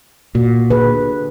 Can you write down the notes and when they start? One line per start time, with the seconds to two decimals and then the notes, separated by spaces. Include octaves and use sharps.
0.35 A#2 F#4
0.70 D3 G#4 B4